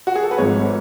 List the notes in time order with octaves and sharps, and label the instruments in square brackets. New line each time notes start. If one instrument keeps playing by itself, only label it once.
[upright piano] F#4
G#4
A4
B4
[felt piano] G#1 G#2 F3 [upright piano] C#5